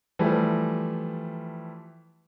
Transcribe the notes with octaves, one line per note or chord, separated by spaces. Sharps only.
E3 F3 G3 A3